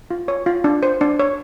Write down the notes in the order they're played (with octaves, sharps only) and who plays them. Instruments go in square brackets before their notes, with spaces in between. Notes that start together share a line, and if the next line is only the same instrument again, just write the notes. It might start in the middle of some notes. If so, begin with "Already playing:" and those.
[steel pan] F4
C#5
F4
D4
C5
D4
C#5